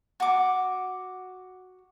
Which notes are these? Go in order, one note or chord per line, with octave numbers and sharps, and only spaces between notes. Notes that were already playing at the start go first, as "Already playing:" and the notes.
F#4 D6